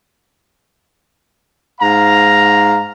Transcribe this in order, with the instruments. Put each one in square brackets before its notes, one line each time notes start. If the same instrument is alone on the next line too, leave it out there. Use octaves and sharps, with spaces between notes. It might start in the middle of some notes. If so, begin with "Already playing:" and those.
[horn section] G#2 F5 A#5